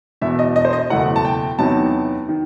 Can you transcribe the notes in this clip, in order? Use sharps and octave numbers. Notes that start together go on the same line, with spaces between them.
E1 E2 B2 E5
D#5
D#5
C5
D#5
F#1 E2 B2 A3 E4 F#5
A5
G5
E2 C3 F#3 B3 D#4 A5
D#3